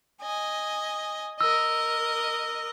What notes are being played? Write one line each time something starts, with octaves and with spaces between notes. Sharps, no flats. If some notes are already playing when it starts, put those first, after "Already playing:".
D#5 G#5
A#4 D#5 E6